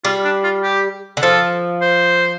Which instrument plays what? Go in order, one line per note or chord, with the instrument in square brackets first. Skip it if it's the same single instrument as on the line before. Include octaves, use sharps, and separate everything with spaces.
[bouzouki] G3 [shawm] F4
[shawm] D4
F4
G4
[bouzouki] D3
[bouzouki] F3 [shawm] A4
[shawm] C5